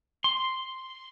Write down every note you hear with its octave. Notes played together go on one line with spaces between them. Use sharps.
C6